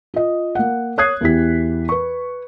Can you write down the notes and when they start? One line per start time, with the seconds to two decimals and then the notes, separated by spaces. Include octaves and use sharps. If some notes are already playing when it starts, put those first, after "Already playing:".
0.14 F4 D#5
0.55 A#3 F#5
0.98 C#5 D#6 F#6 G#6 C7
1.21 E2 E3 E4 G4 B6
1.89 B4 C#6